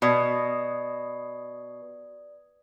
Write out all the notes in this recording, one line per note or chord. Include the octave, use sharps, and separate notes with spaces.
B2 D5 D#6 G#6